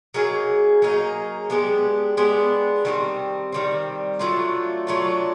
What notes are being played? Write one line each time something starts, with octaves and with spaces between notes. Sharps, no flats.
F#3 A#3 D#4 G#4
F#3 A#3 D#4 G#4
G#3 B3 D4 G4
G#3 B3 D4 G4
D#3 G3 C4
D#3 G3 C4
F#3 A3 D4 F4
F#3 A3 D4 F4